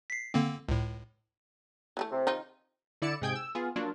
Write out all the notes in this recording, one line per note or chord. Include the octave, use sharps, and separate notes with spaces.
B6 C7
D3 A#3 C4
C#2 A2
E3 G3 A3
C3
D#3 D#4 F4
D3 E4 D5 C#7 E7
G#2 C3 G#4 G5 G6 G#6
E6
B3 F4 G#4
F#3 A#3 D4 F4